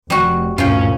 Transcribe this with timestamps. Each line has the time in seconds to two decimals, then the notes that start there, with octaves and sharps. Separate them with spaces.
0.10 F1 G3 F#4
0.58 G#1 D2 G2 A#2 C#4 F4 G5